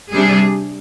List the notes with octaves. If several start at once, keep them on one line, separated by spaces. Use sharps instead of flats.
C3 G3 D4 G#4